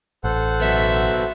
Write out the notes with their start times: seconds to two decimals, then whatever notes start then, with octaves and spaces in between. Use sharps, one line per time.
0.24 A1 A4 C5 F#5
0.60 F#3 B3 E5